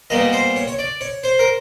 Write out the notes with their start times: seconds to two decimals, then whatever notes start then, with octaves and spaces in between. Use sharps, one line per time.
0.10 A#2 G3 B3 D#5
0.33 C5
0.56 C#5
0.68 C#5
0.79 D5
1.01 C#5
1.23 C5
1.39 A#4